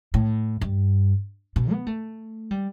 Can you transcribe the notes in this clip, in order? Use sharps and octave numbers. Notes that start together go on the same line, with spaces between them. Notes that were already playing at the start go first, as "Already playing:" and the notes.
A2
G2
B2
B3
A3
G3